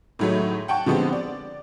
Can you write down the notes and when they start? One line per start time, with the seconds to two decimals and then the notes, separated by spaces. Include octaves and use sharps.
0.19 A2 D#3 F#3 G#3 A3
0.68 F#5 G5 A5 C#6
0.86 D3 F3 G#3 B3 C4 G4
1.13 D5